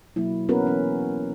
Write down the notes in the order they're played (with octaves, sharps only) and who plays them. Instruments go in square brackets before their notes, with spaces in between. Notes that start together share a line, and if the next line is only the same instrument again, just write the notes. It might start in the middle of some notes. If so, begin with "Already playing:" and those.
[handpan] B2 F#3 A#3 E4
A#3 B3 C#4 F#4 A#4 B4
E3 C#4